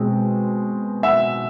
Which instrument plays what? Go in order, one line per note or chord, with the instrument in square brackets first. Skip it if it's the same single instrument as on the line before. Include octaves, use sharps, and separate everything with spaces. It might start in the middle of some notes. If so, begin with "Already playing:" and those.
Already playing: [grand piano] B2 G#3 C4
E5 F#5